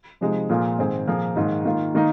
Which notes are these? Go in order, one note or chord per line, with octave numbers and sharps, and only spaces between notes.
C3 F3 G#3 D#4
A#2 F3 A#3 F4 G#4
G#2 D#3 C4 G#4
A#2 F3 A#3 G#4
G#2 D#3 A#3 D#4
D#3 A#3 F4
D#3 A#3 D#4